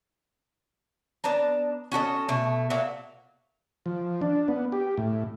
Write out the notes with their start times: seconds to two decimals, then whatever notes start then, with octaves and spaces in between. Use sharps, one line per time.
1.24 B3 D4 A5 A#5
1.92 C#4 F#4 A4 D#5
2.29 B2 A3
2.70 A#2 F#4 E5 F5
3.86 F3
4.21 D4
4.48 B3
4.72 G4
4.97 A2